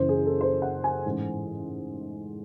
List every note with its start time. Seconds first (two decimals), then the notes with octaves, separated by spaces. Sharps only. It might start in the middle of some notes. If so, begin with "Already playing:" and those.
Already playing: F#1 F#2 E3 C5
0.09 G#4
0.26 A4
0.41 C5
0.62 F#5
0.84 G#5
1.05 A1 G#2 E3